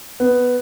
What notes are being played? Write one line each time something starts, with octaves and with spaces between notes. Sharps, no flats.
B3